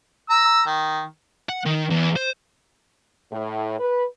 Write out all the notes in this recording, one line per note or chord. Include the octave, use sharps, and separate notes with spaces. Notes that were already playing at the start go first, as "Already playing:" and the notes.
A#5 E6
D#3
F#5
D#3
E2
C5
A2
B4